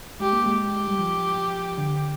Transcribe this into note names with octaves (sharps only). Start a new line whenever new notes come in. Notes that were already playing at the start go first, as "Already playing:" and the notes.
G#3 G4
A#3
G#3
G4
G3
F3
D3